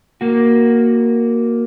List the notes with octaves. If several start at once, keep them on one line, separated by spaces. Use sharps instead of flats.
A#3 F#4